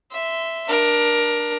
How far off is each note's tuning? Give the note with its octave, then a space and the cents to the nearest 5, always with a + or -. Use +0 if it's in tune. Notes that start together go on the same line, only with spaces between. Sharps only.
E5 +0 C6 -20
D4 +20 A#4 +20